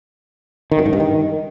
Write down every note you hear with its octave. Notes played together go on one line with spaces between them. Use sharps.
D#3
F#2
G#2
G2
D#3